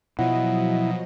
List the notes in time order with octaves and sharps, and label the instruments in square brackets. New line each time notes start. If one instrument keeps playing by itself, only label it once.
[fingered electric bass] B2 [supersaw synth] F3 F#3 D#5 [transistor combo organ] E4 [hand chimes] F#5